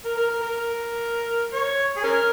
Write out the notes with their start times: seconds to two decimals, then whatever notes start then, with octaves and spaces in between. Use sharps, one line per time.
0.05 A#4
0.17 A#4
0.30 A#4
0.42 A#4
1.54 C#5
1.97 G#4
2.04 C#4 A#4